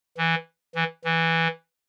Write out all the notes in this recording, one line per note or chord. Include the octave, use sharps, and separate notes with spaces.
E3
E3
E3